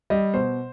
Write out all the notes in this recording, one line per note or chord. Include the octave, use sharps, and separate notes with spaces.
G3 D#5
B2 C5